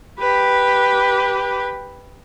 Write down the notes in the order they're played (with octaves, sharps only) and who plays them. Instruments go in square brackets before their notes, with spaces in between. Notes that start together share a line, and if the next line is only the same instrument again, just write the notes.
[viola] G4 B4